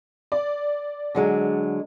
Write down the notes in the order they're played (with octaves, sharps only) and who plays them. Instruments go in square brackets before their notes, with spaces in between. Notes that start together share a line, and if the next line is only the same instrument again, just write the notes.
[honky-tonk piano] D5
[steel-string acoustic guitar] D3 F#3 G#3